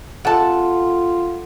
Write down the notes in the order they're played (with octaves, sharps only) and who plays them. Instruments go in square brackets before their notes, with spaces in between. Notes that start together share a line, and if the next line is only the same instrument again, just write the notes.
[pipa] C3 A5 [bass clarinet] F4 [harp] A4 F#5